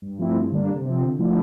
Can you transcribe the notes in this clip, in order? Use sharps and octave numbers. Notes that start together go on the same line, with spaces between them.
G2
F3 A3 C4 E4
G2
D3 G3 A#3 D4
C3
F3 C4
D3
F3 A3 E4